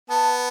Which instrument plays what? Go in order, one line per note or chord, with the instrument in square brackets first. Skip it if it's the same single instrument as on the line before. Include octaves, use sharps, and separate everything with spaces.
[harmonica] B3 [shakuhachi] A5